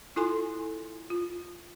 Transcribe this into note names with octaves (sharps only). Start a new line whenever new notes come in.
E4 F4 A4 G#5 C6
F4